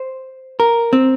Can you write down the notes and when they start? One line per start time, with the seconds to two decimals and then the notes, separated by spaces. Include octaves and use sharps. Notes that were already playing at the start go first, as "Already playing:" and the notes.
Already playing: C5
0.60 A#4
0.93 C4